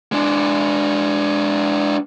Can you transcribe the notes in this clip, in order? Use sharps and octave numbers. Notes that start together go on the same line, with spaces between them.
G#3 D4